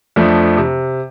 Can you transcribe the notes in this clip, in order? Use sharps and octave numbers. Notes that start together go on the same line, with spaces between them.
F2 F3 A3 D4
C3